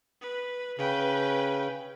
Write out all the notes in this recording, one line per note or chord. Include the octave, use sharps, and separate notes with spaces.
B4
C#3 B4 G5